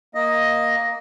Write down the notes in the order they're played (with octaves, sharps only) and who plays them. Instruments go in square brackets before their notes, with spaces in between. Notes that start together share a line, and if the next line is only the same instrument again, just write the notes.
[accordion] A#3 D#5